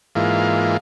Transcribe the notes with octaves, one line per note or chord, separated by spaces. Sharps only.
G#2 E3 A#3 F4